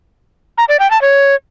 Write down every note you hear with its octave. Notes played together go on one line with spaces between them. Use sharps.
A#5
D5
G5
A5
C#5